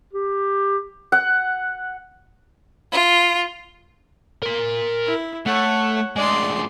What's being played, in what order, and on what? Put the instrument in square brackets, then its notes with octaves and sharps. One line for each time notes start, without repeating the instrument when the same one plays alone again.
[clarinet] G4
[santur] F#5
[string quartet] F4
[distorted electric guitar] A#4 C6
[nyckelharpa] E4
[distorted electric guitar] A3 [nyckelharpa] C#5 F#5
[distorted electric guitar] D2 G#3 [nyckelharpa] D5 C6